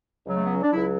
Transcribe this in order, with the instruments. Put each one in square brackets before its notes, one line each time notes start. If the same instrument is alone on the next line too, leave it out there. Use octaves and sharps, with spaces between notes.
[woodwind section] C#2 C#3 F#3
A3
B3
C#4
D4
C#2 C#3 F#3 E4